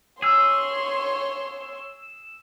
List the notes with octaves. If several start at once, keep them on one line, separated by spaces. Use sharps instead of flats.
G#4 C#5 C6 E6